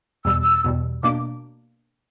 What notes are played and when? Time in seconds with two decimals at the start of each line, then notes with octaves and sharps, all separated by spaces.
0.25 E2 B2 G3 E6
0.41 E6
0.64 E2 B2 G3
1.03 B2 A#3 D4 D6